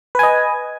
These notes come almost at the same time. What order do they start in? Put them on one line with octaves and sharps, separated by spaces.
B4 G#5 D#5